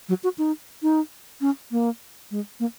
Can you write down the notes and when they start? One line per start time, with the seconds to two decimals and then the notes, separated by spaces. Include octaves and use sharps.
0.09 F#3
0.24 F#4
0.38 D#4
0.82 D#4
1.41 C#4
1.71 A#3
2.31 G#3
2.60 A#3